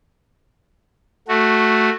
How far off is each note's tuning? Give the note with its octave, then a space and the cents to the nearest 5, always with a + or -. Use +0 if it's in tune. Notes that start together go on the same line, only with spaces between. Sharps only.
A3 +0 F#4 +0